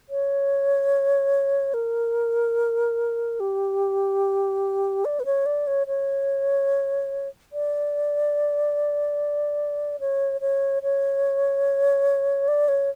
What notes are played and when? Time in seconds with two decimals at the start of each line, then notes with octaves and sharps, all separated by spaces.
0.09 C#5
1.74 A#4
3.40 G4
5.05 D5
5.20 B4
5.25 C#5
5.46 D5
5.67 C#5
5.87 C#5
7.53 D5
10.00 C#5
10.41 C#5
10.83 C#5
12.48 D5
12.68 C#5